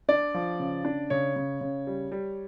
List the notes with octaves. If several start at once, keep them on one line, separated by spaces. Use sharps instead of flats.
D4 D5
F3
C#3
D4
C#3 C#5
C#3
C#3
G3
G3